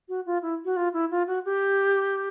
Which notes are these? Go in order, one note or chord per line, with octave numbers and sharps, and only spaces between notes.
F#4
F4
E4
F#4
F4
E4
F4
F#4
G4